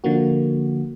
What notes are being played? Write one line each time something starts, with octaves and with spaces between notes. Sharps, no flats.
D3 F3 A#3 F#4